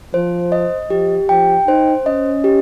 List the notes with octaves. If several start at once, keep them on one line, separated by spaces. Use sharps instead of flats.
F3 C5
D#5
F3 G4
F3 G5
D#4 C5
C#4 D#5
G4